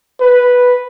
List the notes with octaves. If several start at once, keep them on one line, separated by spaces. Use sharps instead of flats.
B4